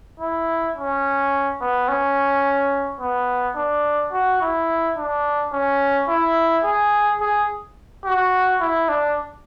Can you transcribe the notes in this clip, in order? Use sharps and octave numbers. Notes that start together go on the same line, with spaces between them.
E4
C#4
B3
C#4
B3
D4
F#4
E4
D4
C#4
E4
G#4
G#4
F#4
E4
D4